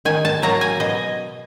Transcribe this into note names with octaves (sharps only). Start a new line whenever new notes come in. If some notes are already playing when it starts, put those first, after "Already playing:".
D#3 G#5
A5
F#3 A#3 A#5
G#5
B2 D#5